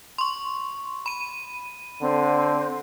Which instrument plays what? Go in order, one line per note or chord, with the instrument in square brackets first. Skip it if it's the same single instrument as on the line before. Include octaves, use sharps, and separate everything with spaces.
[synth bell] C6 C#6
B5 D#7
[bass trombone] D3 [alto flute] C4